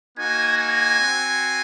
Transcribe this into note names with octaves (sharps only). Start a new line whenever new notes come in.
A#3 D#4 F#4 G#5
G#5
C4 F#4